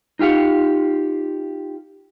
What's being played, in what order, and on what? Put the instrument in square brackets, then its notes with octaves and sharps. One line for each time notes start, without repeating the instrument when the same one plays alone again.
[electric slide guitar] D#4 F4 G4 F5 F#5